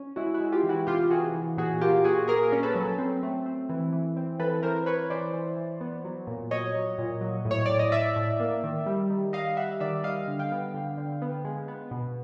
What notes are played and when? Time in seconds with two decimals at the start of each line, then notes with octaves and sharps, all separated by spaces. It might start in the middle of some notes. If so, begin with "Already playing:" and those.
Already playing: C#4
0.16 G#3 E4 F#4
0.34 E4 F#4
0.40 G#3
0.52 F4 G4
0.63 E3
0.69 E4 F#4
0.87 C3 F4 G4
1.10 E3 F#4 G#4
1.34 E3
1.57 A#2 F#4 G#4
1.81 A#3 F4 G4
2.04 A#2 F#4 G#4
2.28 A#3 G#4 A#4
2.52 C#4
2.63 A4 B4
2.75 F#3
2.98 C4
3.23 A3
3.46 C4
3.69 E3
3.93 E3
4.17 C4
4.40 E3 A4 B4
4.63 E3 A#4 C5
4.86 E3 B4 C#5
5.10 E3 C5 D5
5.33 E3
5.57 E3
5.81 B3
6.05 F#3
6.27 A#2
6.51 F#3 C#5 D#5
6.75 F#3
6.98 A#2
7.21 F#3
7.45 A2
7.51 C#5
7.66 A2 D5
7.79 D#5
7.92 A2 D5 E5
8.16 A2
8.40 A#3
8.63 D#3
8.86 G3
9.10 D#3
9.33 G3 D#5 F5
9.57 G3 E5 F#5
9.80 D#3 D5 E5
10.04 G3 D#5 F5
10.28 D3
10.39 F5 G5
10.51 B3
10.74 D3
10.97 D3
11.22 B3
11.45 G#3
11.68 B3
11.91 B2